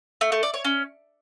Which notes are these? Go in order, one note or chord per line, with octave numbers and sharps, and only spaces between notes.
A3
A3
D5
C#5
C#4